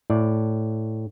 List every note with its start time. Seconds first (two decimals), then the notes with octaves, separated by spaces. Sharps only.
0.10 A2 D5